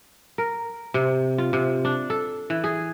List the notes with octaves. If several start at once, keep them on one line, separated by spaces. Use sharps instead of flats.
A#4
C3
F4
C3
D4
A4
E3
G#4